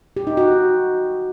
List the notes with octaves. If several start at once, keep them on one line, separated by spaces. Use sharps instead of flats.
G4
D#4
F#4